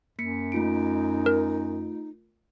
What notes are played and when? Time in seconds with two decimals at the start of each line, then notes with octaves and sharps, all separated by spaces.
0.19 F#2 A#3 B6 C#7
0.52 A3 D#4 F4 D7
1.26 A#4